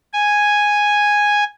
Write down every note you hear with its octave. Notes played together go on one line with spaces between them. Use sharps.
G#5